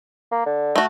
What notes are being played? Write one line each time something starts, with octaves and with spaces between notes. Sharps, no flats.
A#3
D3
A3 F#4